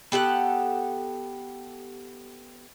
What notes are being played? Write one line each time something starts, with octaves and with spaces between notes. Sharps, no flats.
B3 G4 A4 F#5